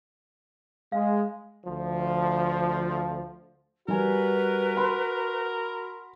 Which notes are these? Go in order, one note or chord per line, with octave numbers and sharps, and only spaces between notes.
G#3 F5
D2 F3
G3 F#4 A#4 B4 G#5
B5 C6